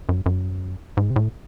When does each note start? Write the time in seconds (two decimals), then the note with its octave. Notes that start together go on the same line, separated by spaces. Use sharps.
0.09 F#2
0.26 F#2
0.97 G#2
1.10 C3
1.16 A2